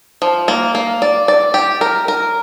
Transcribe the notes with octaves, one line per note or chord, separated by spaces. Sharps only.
F3
A#3
A#3
D5
D5
G4
A#4
A#4